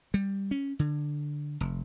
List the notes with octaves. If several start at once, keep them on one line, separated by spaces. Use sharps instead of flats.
G3
C#4
D3
F1